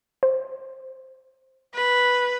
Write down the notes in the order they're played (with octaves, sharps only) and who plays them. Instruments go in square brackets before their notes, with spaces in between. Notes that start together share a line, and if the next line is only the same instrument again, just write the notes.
[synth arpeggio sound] C5
[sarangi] B4